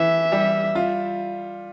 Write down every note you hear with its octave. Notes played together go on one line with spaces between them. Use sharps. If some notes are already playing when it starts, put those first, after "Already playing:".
Already playing: E3 E5
G3
F4